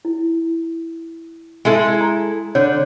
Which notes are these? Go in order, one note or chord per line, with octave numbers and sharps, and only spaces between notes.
E4
G#3 E4 A4
A#5
D3 C#5